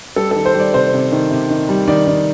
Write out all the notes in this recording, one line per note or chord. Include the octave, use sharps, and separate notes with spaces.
G3 A4
D#3 A4
C5
G3 D5
C3 C5
C3
D#3
C3
D#3
G3
D#3 D5
D#3